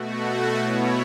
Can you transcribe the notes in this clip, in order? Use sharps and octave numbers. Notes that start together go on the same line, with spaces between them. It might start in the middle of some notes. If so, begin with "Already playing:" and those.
Already playing: B2 A3 F#4
B2 B3 E4 C#5